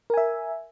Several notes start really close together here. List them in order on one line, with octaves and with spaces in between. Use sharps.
A#4 G#5 E5